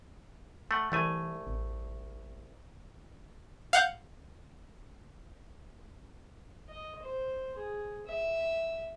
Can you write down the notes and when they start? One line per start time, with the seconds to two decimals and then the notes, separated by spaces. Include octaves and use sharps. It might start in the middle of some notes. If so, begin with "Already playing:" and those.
0.71 A3 F#5
0.92 C2 E3 A3 G#5
1.47 A1
3.73 F5 F#5 G6
6.68 D#5
7.02 C5
7.57 G#4
8.06 E5